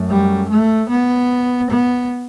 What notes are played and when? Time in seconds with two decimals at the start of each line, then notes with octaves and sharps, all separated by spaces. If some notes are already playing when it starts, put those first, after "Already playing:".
Already playing: F#2 F#3 A3
0.09 G3
0.49 A3
0.89 B3
1.70 B3